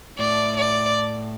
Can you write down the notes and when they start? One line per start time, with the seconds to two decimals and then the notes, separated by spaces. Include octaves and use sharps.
0.18 A2 D5
0.57 D5